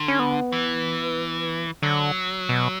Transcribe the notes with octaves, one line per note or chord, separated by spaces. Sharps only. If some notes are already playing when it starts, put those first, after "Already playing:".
Already playing: D3
C#4
B3
E3
D3 F#3
B2